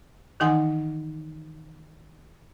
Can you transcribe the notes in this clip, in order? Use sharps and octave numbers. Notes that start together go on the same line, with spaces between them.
D#3 E3 D#4 F#5 G#5 C6